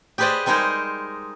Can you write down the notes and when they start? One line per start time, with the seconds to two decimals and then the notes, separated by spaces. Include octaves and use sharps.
0.18 G4 G#4 B4 C5 D5 D#5
0.46 G3 G#3 D#4 G#4 A#4 C5